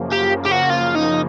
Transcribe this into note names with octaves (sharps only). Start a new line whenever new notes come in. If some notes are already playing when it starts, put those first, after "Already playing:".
Already playing: F#2 C#3 F3 A#3
G4
G4
F#4
F4
D#4